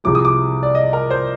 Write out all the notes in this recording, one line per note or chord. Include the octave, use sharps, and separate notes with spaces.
C2 C3 F3 G#3 D6
D#6
D6
D5
D#5
A#4
C5